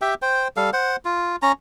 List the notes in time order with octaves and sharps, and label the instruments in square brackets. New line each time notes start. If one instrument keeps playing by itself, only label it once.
[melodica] G4 E5 G5
C5 G5
G3 A4 F5
C5 F#5
F4
C#4 A#5